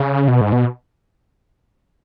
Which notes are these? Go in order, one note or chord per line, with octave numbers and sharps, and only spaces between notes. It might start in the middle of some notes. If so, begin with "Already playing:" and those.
Already playing: C#3
B2
G#2
B2